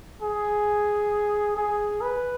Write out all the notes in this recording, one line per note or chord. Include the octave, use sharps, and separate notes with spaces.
G#4
G#4
B4